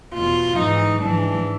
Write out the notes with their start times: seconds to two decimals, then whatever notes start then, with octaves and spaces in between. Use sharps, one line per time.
0.15 E2 B2 F4
0.58 G#2 E3 D#4
1.03 G#2 E3 D4